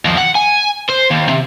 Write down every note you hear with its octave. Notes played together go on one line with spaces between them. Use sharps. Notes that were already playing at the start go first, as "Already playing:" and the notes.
D#2 F3
F#5
G#5
C5
D#2
C3